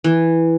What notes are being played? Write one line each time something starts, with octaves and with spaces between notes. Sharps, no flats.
E3